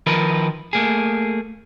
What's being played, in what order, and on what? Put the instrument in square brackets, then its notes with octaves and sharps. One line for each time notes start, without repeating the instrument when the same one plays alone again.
[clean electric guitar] D#3 F3 A#4 B4
A3 A#3 G#4